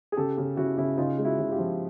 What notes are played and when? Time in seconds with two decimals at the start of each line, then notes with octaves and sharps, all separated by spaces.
0.12 G#4
0.16 C#3 G4 A4
0.38 C#3
0.57 C#3 E4 F#4
0.78 C#3 E4 F#4
0.97 C#3 D#4 F4
1.18 G#3
1.25 E4 F#4
1.38 C#3 F#4
1.51 F4 G4
1.58 F3